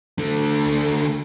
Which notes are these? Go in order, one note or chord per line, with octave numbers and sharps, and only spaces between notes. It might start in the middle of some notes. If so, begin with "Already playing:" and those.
D3 A3